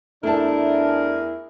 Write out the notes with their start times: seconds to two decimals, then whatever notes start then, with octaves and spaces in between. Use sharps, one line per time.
0.23 E2 A3 D4 E4 G#4 A#4 A5